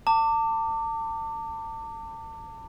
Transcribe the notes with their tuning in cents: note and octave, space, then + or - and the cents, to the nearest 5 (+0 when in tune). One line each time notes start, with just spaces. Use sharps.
A5 +35 D6 +0